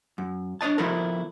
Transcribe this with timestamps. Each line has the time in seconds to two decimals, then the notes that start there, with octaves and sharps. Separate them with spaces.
0.18 F#2
0.61 D4 C#5 D#5 A5
0.78 F3 B3 D#4 E4 A4 A#4